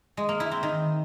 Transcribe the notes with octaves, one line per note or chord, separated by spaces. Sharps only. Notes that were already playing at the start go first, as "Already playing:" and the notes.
G#3
A#3
E4
C4
D#3